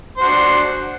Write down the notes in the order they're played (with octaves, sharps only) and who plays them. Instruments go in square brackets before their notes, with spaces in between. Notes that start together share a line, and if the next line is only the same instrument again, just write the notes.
[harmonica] C5
F#4
D4